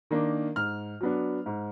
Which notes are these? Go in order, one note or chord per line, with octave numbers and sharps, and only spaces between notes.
D#3 A#3 D4
G#2 F6
F#3 B3 D4
G#2